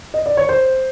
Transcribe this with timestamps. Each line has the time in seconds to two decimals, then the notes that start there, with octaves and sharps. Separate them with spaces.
0.14 D#5
0.26 D5
0.37 C#5
0.49 C5